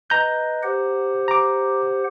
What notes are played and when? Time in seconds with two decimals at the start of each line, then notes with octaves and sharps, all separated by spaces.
0.10 B4 D#5 A#5 G6
0.62 G4 C5 F#5
1.28 A#5 D6